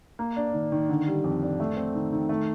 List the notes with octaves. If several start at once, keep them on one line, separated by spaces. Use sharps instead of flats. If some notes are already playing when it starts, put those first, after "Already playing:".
A#3
D4
D#3
D#3
D3
G3
F2
D4
A3
C4
D#3
D#3
A3